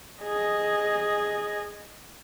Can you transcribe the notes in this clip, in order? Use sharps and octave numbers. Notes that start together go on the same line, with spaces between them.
G#4 D#5